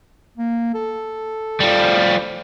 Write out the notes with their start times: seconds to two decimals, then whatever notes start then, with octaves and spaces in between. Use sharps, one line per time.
0.38 A#3
0.74 A4
1.60 F3 G3